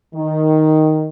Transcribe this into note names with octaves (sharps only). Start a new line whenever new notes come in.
D#3